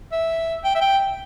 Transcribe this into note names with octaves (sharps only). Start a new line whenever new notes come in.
E5
G5
E5
G5